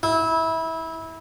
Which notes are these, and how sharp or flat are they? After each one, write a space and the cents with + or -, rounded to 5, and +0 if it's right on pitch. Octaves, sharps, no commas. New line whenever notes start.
E4 -20